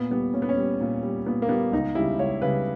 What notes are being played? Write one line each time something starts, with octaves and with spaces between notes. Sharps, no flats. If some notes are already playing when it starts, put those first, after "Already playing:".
Already playing: A#2 B3
G3 B3
A#2 C#4
B3
C#4
G3
A#2
G3
A#2 B3
A#3
G3 B3
C#2 D#4
C#3 G3 E4
C#2 C#5
C#3 G3 B4